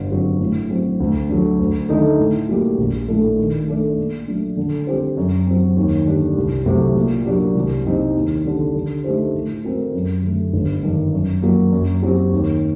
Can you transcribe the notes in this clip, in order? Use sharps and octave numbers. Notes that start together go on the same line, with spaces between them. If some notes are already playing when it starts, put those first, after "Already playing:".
Already playing: G1
G2 F#3 C4
A2
F#3 C4
D2
D3 F#3
D2
D3 A3 D#4 A4
A2
G3 A#3 F#4
A#1
A2 A3 D4 A4
D#3
A3 D4 A4 D5
A#2
F#3 A3 D4
D3
G3 C4 G4 C5
F#2
F#3 C4
D#2
D3 G3 D4
C2
C3 F#3 A3
A#2
F#3 A#3 D4 G4
C2
C3 G3 C4 D#4
D#2
D3 G3
D3
A3 D#4 G4 C5
A2
A3 C4 F#4 A#4
F#2
D3 A3
G1
G2 D#3
F#2
F#3 A#3
F#2
F#3 C4 G4
D#2